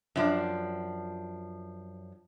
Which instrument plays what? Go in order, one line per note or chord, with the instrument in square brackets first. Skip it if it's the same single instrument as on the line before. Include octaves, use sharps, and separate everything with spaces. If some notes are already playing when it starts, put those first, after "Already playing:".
[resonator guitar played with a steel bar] F#2 F3 D4